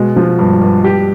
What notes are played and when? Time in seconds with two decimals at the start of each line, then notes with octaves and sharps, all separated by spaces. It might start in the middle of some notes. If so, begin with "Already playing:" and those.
Already playing: B2 G#3
0.16 F3
0.39 G2
0.61 G2
0.84 G4